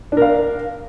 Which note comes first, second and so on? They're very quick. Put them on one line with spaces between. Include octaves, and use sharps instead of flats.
D4 A#4 F5